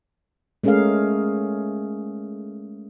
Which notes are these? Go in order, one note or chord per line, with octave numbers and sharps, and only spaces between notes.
G#3 A3 C#4 G#4 A#4 F5